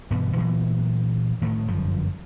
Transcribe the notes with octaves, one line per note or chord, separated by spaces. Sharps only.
G2 B2 E3 B3
A#2 E3 F#3 B3
A2 D#3 A3
G1 F#2 F3